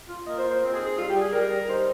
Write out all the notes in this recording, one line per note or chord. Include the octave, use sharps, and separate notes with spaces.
F4
A#3 D#5
C5
F4
C5
C4
G#4
D#4
G#4
G3 F4
G4
G3
G#4
G3 A#4
G3
D#4 C5